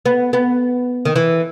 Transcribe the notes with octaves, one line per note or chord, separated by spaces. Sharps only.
B3
B3
D#3
E3